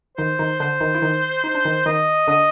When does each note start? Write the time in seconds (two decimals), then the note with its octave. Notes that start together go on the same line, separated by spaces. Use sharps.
0.18 D#3 D#4 C5
0.39 D#3 D#4
0.60 D3 D4 C5
0.81 D#3 D#4
0.95 E4
1.02 D#3 D#4
1.44 D#4
1.55 D4
1.65 D#3 D#4
1.86 D#3 D#4 D#5
2.27 D3 D4 D#5